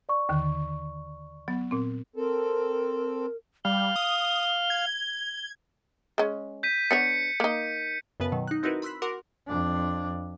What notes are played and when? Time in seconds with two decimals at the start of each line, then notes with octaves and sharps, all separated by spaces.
0.09 D5 C#6
0.29 D#2 D3 D#3
1.48 F#3 B3
1.71 A#2 C4
2.16 C4 A4 A#4
3.65 G3 F5 G7
3.96 D#6
4.70 G#6
6.18 G#3 C#4
6.63 G6 B6 D#7
6.91 B3 D4 C#5 C#7
7.40 A#3 D#4
8.20 F#2 C#3 B3 B4 A5
8.32 B2 D#3 F#3
8.48 D#4 F#6
8.63 C4 D#4 E4 F#4 A#4 B4
8.82 B5 C6 E6 F#6 B6
9.02 F#4 A#4 F#5 C6 D6
9.48 F2 D4